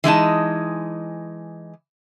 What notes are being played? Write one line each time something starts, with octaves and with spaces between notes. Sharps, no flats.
E3 G#3 D#4 A5